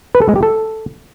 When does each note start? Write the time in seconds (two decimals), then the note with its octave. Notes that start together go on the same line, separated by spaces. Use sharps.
0.15 B4
0.22 A4
0.29 G#3
0.36 G4
0.43 A4